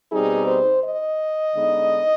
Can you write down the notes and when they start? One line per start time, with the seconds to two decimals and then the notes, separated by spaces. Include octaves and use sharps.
0.11 B2 G3 C4 D#4 G#4
0.47 C5
0.82 D#5
1.54 D3 G#3 B3 D#4